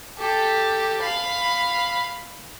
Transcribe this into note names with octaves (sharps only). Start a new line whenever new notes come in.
G4 A4
F5 B5